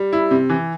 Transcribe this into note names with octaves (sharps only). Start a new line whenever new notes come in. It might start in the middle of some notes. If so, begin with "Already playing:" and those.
Already playing: G3
E4
C3
E3